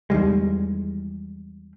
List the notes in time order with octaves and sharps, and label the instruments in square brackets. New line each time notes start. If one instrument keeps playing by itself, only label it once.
[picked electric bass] E2 D#3 G3 G#3